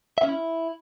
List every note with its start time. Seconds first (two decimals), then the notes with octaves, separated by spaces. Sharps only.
0.18 E5
0.23 C#4
0.29 E4